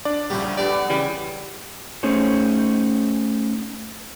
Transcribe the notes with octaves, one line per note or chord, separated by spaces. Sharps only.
D4 D5
A#1 A2 C#3 F3 G3 E4 F#4 G4
B3 D4 G4 A4 D5
C#3 E3 G3
A3 C#4 D#4 G#4 C5 C#5